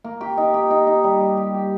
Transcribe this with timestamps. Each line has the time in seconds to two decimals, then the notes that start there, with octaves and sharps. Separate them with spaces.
0.04 A#3
0.21 G4
0.37 D#4
0.54 G4
0.71 D#4
0.87 D#4
1.04 G3
1.20 G3
1.37 G4
1.54 G4